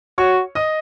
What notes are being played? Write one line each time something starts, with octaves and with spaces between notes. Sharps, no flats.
F#4 C#5 C#6
D#5 D#6